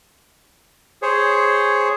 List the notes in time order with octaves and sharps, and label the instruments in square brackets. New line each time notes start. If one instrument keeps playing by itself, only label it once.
[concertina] G#4 C5 C#5